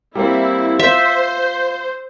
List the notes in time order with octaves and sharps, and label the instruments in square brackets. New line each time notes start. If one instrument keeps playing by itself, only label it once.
[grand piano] G3 A#3 C4 [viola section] E4
[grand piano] F4 [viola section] C5 [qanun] E5